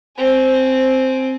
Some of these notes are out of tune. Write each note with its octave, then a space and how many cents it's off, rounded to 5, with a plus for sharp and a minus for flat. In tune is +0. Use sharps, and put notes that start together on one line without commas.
C4 +0 G#5 +25